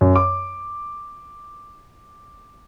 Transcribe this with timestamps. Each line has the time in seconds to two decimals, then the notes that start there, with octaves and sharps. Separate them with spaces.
0.01 F#2
0.16 D6